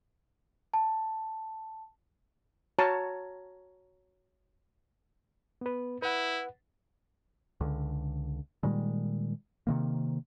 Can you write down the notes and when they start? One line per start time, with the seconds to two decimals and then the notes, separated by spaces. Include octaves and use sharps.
0.74 A5
2.79 F#4 C#5 A5 A#5
5.61 B3 B4
6.02 E4 B4 F#5
7.61 C#2 D3
8.63 A#2 D#3 G3 G#3
9.67 C3 D#3 A#3